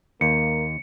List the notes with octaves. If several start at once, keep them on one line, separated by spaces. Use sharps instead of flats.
D#2 A#3 C#7